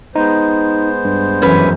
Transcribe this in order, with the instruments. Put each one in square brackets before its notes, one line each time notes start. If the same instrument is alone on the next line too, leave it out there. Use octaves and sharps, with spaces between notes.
[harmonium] G#3 B3 C5 [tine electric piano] D#4
[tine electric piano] G2
[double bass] F#2 E3 [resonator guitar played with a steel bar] C#4 B4